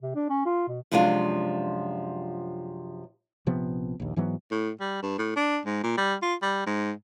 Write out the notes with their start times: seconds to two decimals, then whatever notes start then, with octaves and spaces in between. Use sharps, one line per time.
0.02 C3
0.15 D4
0.29 C#4
0.46 F4
0.68 B2
0.92 F#2 C3 F3 G#3 D4 F4
3.46 A#1 C3 F3 B3
4.00 A#1 D#2
4.16 G#2 E3 F#3 B3
4.51 A2
4.81 G3
5.03 G2
5.18 A2
5.37 D4
5.66 G#2
5.84 A#2
5.98 G3
6.22 F4
6.42 G3
6.67 G#2